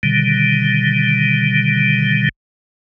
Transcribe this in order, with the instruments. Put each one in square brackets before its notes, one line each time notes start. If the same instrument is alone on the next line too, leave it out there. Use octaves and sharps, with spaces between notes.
[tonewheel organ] B2 D3 D#3 G3